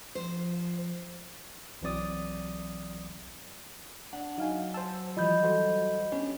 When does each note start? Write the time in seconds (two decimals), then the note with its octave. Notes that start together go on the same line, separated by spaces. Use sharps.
0.15 F3 C5
1.81 B1 E3 F#3 C4 D5 D#6
4.13 D4 F#5
4.38 F#3 D#4 F5 G#5
4.74 C5 A5 E6
5.17 E3 F3 G3 D#5 B5 G6
5.43 F#4 A4 C5
6.12 B3 C#4 D4 G4